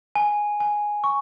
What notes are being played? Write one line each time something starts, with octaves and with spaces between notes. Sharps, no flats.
G#5
G#5
C#6